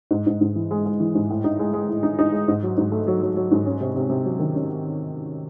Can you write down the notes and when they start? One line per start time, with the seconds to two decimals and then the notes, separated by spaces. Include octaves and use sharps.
0.11 G#2
0.27 G#2
0.41 G#2
0.56 E3
0.71 G#3
0.86 G#3
1.00 E3
1.15 G#2
1.30 A2
1.44 D#4
1.59 G#3
1.73 G#3
1.88 A2
2.03 D#4
2.19 D#4
2.32 G#3
2.48 G#2
2.63 F#3
2.78 G#2
2.92 A3
3.07 F#3
3.22 F#3
3.36 F#3
3.52 G#2
3.66 C#4
3.81 C3
3.96 C3
4.10 C3
4.25 F#3
4.39 D#3
4.55 C#4